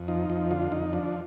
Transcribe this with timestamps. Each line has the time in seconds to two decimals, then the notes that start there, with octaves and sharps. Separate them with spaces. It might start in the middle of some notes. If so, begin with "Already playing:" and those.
Already playing: F2
0.08 F3 D#4
0.30 F2
0.51 D3 F4
0.72 F2 D#4
0.93 F3 D4